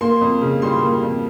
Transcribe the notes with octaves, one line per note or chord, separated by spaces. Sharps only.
A#3 C6
F2
C#3
G3 C6
A#3
F2